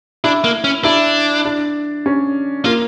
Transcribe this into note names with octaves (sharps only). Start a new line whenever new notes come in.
D4 E4
A#3
C#4
D4 E4
D4
C#4
A#3 F4